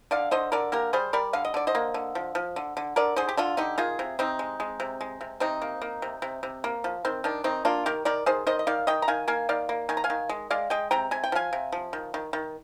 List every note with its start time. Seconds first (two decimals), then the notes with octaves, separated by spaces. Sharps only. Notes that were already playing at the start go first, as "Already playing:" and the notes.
0.11 D3 D5 F5
0.31 D3 C5 D#5
0.52 D3 A#4 D5
0.72 A#3 G4 A#4
0.93 G3 G#4 C5
1.13 G3 A#4 D5
1.33 D3 F5
1.45 D#5
1.54 D3 D5
1.67 C5 D#5
1.75 A#3
1.94 D3
2.15 F3
2.35 F3
2.56 D3
2.77 D3
2.96 D3 A#4 D5
3.16 D3 G#4 C5
3.29 G4
3.37 D3 D4 F4
3.57 D3 D#4 G4
3.78 D#3 F4 G#4
3.99 C3
4.19 C3 C4 D#4
4.39 G#3
4.60 G#3
4.80 C3
5.01 G#3
5.21 C3
5.40 C3 C4 D#4
5.62 A#3
5.81 A#3
6.02 C3
6.22 C3
6.43 C3
6.64 A#3
6.84 F3
7.05 D#3 C4
7.24 D#3 D4
7.44 D#3 C4 D#4
7.65 A#3 D4 F4
7.86 D#3 G4 A#4
8.05 D#3 A#4 D5
8.26 D#3 G#4 C5
8.47 D#3 C5 D#5
8.59 D#5
8.67 D#3 D5 F5
8.87 D#3 D#5 G5
9.02 A#5
9.08 D#3 F5 G#5
9.28 A#3 F5 G#5
9.49 D#3 D5 F5
9.69 A#3
9.89 D#3 G#5
9.97 A#5
10.04 F5 G#5
10.10 D#3
10.29 G#3
10.50 G#3 D5 F5
10.70 G#3 D#5 G5
10.91 C3 G5 A#5
11.11 C3 G#5
11.24 G5
11.32 F3 F5 G#5
11.53 C3
11.72 F3
11.93 D#3
12.14 D#3
12.33 D#3